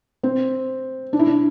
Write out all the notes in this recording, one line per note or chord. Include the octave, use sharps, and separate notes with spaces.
C4
D4
E4
D4